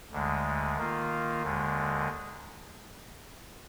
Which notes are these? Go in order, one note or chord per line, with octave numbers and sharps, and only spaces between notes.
D2 D3 G#3
D#3 A#3 F4
D#2 D3 G#3